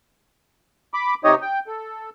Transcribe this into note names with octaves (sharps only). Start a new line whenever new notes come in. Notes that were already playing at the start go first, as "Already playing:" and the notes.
B5 D6
C3 D#4 G4 C#5 D#5 D#6
G5
A4